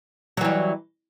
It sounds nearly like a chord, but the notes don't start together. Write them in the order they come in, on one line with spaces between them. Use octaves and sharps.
F#3 E3 G3